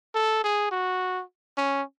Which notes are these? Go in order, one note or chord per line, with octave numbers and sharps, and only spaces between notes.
A4
G#4
F#4
C#4